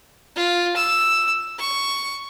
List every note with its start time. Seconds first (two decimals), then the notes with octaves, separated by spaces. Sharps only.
0.36 F4
0.76 E6
1.59 C#6